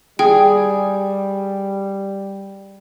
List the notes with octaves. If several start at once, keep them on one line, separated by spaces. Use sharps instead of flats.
G3 G#4 G5